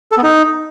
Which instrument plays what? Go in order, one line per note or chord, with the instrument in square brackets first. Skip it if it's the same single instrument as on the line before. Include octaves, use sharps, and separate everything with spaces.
[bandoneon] A4
B3
D#4